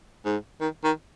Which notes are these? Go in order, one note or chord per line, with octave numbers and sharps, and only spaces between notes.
G#2
D#3
D#3